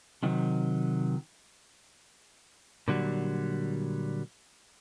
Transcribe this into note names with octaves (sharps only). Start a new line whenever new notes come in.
C3 D#3 F#3
A#2 D3 F#3 G3